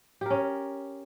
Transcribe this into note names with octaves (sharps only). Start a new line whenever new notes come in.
C#4 G4 A#4